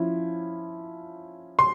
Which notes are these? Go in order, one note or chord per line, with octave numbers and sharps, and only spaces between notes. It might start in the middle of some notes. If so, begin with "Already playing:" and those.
Already playing: F3 C#4 E4
C6